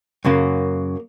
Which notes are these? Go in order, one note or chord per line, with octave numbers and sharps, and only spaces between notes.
F#2 C#3 F#3 A#3